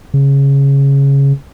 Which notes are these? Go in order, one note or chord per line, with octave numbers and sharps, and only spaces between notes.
C#3